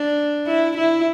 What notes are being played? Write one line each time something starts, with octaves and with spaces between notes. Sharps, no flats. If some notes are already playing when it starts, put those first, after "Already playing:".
Already playing: D4
E4
E4